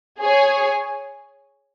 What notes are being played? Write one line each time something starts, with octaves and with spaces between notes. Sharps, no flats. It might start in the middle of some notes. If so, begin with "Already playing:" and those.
G#4 C#5 G#5